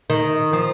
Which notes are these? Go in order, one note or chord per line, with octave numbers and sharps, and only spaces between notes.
D#3
F3